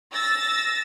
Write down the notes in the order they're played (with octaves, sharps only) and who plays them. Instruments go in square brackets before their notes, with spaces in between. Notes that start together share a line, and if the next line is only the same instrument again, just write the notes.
[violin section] E6 A6 A#6